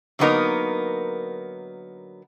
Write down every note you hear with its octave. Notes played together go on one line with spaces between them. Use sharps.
D3 F#3 A#3 B3 D#4 A#4